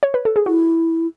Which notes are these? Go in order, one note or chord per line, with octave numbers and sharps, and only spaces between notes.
C#5
B4
A4
G#4
E4 F#4